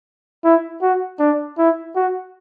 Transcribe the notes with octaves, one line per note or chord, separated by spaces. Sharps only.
E4
F#4
D4
E4
F#4